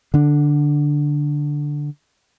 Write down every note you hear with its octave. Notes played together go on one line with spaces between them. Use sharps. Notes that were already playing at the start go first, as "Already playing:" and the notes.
D3 D4